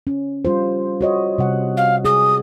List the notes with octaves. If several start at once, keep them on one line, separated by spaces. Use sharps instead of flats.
C#4
G3 F4 C5
F#4 C#5 D#5
C3 G3 F#5
F5
G#4 D#6